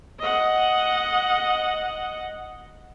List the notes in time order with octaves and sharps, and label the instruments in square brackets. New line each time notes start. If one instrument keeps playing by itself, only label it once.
[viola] D#5 F#5